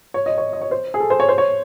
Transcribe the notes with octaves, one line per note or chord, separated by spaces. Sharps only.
C#5
D#5
C#5
D#5
C#5
C5
G#4
A4
C5
C#5
C5
C#5